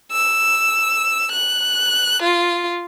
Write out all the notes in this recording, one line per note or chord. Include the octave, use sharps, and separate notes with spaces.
E6
F#6
F4